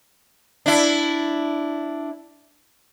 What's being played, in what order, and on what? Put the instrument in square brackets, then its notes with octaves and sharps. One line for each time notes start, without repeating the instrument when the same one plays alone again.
[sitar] D4 E4